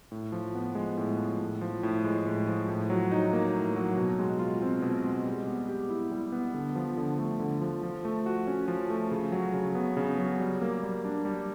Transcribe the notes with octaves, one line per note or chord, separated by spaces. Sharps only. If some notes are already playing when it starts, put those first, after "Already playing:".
A2
F3
B3
G#3
A2
F3
A2
F3
A2
G#3
A2
F3
A2
F#3
D#4
A#3
A2
F#3
B2
G#3
F4
C4
B2
G#3
G3
B3
G4
E4
G3
B3
D3
F3
D3
A3
D3
F3
F3
A3
F#4
C#4
F3
A3
C#3
F#3
C#3
B3
C#3
F#3
G3
A#3
G3
D4
G3